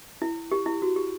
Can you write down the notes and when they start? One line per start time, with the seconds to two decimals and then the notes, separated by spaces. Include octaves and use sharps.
0.22 E4
0.52 G4
0.66 E4
0.82 F#4
0.96 G4